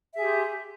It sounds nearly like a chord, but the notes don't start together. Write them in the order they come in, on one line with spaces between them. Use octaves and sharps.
E5 G#4 G4 C6